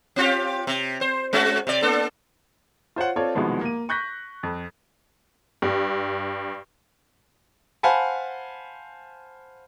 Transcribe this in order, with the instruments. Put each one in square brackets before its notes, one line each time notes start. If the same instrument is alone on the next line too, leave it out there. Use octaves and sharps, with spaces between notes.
[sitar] C4 F4 G4
C3
C5
G#3 C#4 F#4
C3 D5
A#3 D4 A4
[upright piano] F4 C5 C#5 F#5
C4 F4 A4 C#5 D5
C2 B2 D#3 F3 G#3 B3
A#3 D#7
C#6 F#6 G6 A#6 B6
F2
[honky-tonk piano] G2
[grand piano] C5 F5 F#5 G#5 A5 B5